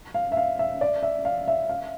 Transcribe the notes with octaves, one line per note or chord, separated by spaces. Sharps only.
F5
E5
F5
E5
D5
E5
F5
E5
F5